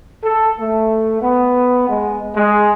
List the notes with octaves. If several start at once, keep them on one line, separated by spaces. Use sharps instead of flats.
A4
A3
B3
G#3
G#3